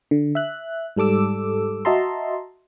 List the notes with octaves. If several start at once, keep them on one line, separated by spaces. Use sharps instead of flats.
D3
E5 F#6
G#2 G3 A4 D6 E6
F#4 D#5 E5 A5 A#5 C6